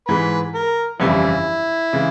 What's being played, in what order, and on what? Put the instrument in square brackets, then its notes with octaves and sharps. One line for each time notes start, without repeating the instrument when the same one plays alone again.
[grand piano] G#2 E3 G#3 [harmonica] B4
[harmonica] A#4
[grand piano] G1 F2 C#3 E3 G3 [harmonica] B3 E4
[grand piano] C#3 E3 G#3